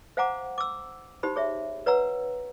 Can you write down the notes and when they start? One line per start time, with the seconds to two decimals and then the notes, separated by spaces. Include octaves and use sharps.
0.17 C5 F5 F#5 G#5 A#5 D6
0.58 D6 E6
1.23 D#4 G4 C5 B5
1.36 G#4 C#5 E5
1.86 B4 C#5 F#5 A#5 E6